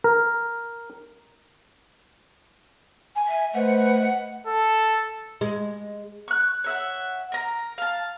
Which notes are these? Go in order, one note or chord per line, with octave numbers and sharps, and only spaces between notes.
A#4
G#5
E5
A3 B4 C5 D#5 F#5
A4
G#3
C#6 F#6
C#5 E5 F#5
A#4 A#5
F5 A5